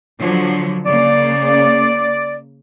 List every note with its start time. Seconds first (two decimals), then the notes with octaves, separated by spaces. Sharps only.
0.20 D3 F3 F#3
0.86 C#3 A#3 D5